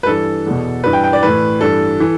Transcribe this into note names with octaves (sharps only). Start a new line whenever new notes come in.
B4
G2 E3 A4
E2 B2
G2 E3 B4
G5
G5
D5
A2 E3 B4
G2 E3 A4
E3